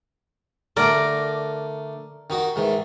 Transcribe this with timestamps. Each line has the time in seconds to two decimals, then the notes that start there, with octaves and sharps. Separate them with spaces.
0.77 D3 A3 A#4 D5 D6
2.30 D#3 D#4 F#4
2.56 G#2 D#3 E3